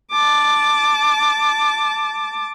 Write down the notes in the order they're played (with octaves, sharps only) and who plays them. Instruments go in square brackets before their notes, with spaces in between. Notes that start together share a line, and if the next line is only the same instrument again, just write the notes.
[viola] A5 D6